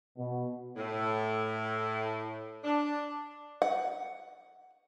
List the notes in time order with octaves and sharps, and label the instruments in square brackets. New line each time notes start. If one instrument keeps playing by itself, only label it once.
[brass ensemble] B2
[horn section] A2
D4
[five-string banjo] F#5